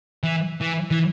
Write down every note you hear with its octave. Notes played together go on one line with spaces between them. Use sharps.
E3
E3
E3